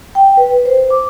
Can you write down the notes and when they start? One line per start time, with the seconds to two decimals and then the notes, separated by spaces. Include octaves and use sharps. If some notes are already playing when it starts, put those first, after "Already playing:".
0.15 G5
0.37 B4
0.65 C5
0.90 D6